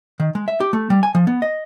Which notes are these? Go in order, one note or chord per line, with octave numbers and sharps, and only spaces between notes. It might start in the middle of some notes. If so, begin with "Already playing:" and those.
D#3
G#3
E5
G4
A3
G3
G#5
F3
B3
D#5